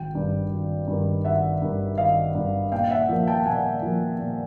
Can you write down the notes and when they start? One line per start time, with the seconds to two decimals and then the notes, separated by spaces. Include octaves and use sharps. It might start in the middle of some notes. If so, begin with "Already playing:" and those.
Already playing: G#1 G5
0.13 G2 D#3
0.51 G#1
0.88 G2 D#3
1.24 G#1 E5 F#5
1.62 G2 D#3
1.98 G#1 D#5 F5
2.35 G2 D#3
2.72 A#2 F5 G5
2.91 E5 F#5
3.09 F3 A#3
3.27 G5 A5
3.46 A#2 F#5 G#5
3.82 F3
3.88 A#3
4.19 A#2